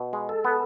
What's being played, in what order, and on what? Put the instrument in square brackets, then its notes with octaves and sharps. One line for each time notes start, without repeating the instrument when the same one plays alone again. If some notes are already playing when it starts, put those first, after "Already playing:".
Already playing: [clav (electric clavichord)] B2
G#3
[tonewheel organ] A4
[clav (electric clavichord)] B3